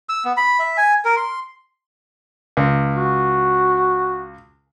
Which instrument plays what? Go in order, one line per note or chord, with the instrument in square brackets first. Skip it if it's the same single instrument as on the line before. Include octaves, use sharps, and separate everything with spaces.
[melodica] E6
B3
B5
E5
G#5
A#4
C6
[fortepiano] C#2
[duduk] F#4